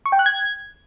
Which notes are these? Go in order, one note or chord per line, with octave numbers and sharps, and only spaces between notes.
C#6
G5
F#6
G#6